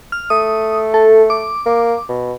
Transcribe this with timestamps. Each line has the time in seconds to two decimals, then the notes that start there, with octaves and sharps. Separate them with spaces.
0.12 F6
0.30 A3 D#6
0.94 A4
1.30 D6
1.66 A#3
2.09 B2